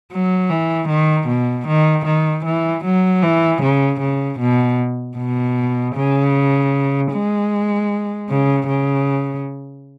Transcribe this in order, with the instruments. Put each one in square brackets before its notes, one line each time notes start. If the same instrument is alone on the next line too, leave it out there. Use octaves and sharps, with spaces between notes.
[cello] F#3
E3
D#3
B2
D#3
D#3
E3
F#3
E3
C#3
C#3
B2
B2
C#3
G#3
C#3
C#3